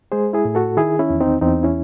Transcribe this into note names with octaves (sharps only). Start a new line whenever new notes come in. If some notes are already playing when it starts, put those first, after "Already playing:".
G#3 G#4 C5
E4 G#4
A2
F#4 A4
D#3 E4 G#4
C#4 E4
E2
C4 D#4
E2 C4 D#4
C#4 E4